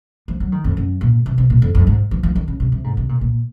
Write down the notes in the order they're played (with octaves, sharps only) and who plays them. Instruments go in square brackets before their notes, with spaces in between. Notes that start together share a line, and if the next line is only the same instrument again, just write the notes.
[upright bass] F3
F#3
D#3
F2
F#2
A#2
C3
C3
A#2
F2
F2
G#2
F3
F3
D#3
C#3
C3
C3
G#2
C3
A#2
A#2